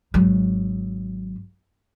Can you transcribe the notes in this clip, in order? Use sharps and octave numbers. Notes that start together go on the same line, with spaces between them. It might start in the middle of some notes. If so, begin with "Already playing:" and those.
G#1 F#3